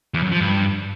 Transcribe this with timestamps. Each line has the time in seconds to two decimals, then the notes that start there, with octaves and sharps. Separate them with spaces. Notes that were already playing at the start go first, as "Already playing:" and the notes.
0.14 E2
0.23 F#2
0.32 F3
0.41 G2